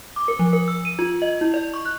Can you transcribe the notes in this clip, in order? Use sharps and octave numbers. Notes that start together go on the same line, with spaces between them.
D6
A#4
F3
A#4
E6
D#7
F4
D#5
E4
D5
C#6
F#6